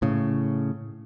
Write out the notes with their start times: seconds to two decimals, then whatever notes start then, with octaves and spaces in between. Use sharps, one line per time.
0.02 A2 C#3